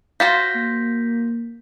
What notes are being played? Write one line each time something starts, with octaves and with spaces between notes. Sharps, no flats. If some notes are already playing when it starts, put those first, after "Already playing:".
F4 F#4 C5 G6 A#6 B6
A#3